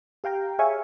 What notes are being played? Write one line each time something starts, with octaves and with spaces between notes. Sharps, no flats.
G4 F5 G5 A#5
G#4 C#5 E5 F5 G#5 C#6